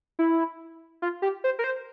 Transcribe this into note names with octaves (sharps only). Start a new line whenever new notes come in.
E4
F4
G4
C5
A#4
C5